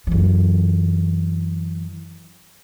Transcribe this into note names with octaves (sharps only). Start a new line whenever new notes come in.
F#2 E3